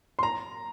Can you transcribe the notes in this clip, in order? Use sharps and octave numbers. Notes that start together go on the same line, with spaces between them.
C6
A#5